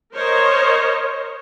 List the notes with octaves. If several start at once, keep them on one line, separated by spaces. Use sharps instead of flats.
A#4 C5 C#5 D#5